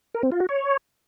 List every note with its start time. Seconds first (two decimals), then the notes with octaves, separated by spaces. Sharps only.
0.14 A#4
0.23 C4
0.32 F4
0.40 F#4
0.49 C#5